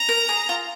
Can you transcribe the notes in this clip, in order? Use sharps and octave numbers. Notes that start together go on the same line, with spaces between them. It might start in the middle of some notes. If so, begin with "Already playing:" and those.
Already playing: A#5
A#4
G#4
F4